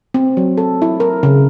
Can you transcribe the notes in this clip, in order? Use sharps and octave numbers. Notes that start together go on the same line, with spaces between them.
C4
F#3
A4
E4
A#4
C#3